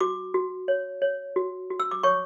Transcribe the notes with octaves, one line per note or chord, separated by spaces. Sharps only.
F#4 D6
F#4
C#5
C#5
F#4
F#4
E6
D6
C#5 C#6